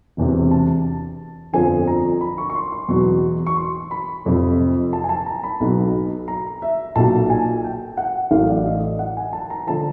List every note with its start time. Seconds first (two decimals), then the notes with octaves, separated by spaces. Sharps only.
0.17 E1 E2 C3
0.51 A5
1.53 G1 F2 D3 F3 G#5
1.87 A#5
2.21 B5
2.38 C#6
2.50 C#6
2.55 C6
2.72 C6
2.88 E2 B2 F#3 C#6
3.46 C#6
3.57 C6
3.91 B5
4.25 F1 F2 C3 F3
4.93 A5
5.04 G#5
5.09 A5
5.26 A#5
5.43 B5
5.60 B1 B2 F#3
6.28 A#5
6.62 E5
6.96 B1 A#2 F#3 A5
7.30 G#5
7.64 G5
7.97 F#5
8.31 A1 A2 F#3 F5
8.49 D5
8.65 D#5
8.99 F#5
9.17 G#5
9.33 A5
9.50 A#5
9.67 D3 F3 A5